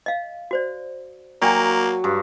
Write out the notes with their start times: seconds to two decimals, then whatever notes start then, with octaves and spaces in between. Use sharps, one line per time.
0.06 D#5 F5
0.51 F#4 C5 D5
1.42 F#3 A#3 D5 G5 G#5
2.04 G2